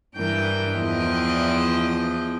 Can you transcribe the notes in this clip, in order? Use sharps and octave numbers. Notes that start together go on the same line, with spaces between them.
G2 E3 G3 A#4 G5 G6
E2 E3 F3 D#5 G5